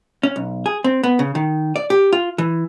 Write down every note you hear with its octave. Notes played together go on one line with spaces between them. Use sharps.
C#4
B1
G#4
C4
B3
C#3
D#3
D5
G4
F4
E3